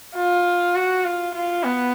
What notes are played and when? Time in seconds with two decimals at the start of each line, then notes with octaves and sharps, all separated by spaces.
0.16 F4
0.76 F#4
1.05 F4
1.34 F4
1.64 B3